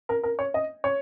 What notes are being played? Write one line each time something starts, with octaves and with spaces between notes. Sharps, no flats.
A#4
A#4
C#5
D#5
C#5